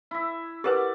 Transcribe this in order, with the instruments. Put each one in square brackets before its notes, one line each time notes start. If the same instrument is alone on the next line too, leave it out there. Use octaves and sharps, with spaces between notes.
[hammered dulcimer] E4 E5
[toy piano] G4 A#4 B4 [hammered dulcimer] D5 F#5 D6